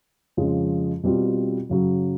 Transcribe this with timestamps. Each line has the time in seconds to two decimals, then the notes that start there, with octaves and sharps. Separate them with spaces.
0.37 F2 C#3 F3 G#3
1.04 B2 G3 C4 F4
1.70 F#2 C#3 F#3